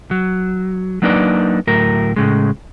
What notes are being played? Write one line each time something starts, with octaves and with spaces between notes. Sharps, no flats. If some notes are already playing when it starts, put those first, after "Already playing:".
F#3
F#3 A#3 D4 D#4 B4 D5
D2 A2 F#3 A#4
A2 C#3 G#3